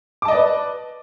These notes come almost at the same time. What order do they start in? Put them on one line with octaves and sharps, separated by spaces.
D6 A5 D#5 D5 B4